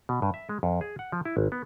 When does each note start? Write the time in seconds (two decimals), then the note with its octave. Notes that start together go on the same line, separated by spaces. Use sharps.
0.09 B2
0.22 G2
0.34 E5
0.49 G#3
0.63 F2
0.81 G#4
0.99 F#5
1.12 F3
1.25 E4
1.37 G#1
1.52 B3